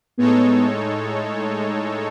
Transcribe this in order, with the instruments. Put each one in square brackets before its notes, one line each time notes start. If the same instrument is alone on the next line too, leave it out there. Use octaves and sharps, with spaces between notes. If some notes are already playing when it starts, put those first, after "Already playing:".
[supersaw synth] A2 G#3 D#4 A4 C#5 [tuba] B3